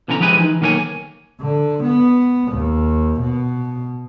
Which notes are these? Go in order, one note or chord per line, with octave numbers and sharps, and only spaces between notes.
B2 D3 E3 C#4 G#5 A#5
F3 G#3 G4 B4 G#5
E3 D#4
B1 D#3 A#3 A#4 C#5 G#5
D3
B3
D#2
B2